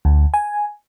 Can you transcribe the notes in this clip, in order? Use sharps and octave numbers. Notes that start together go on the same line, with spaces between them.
D2
G#5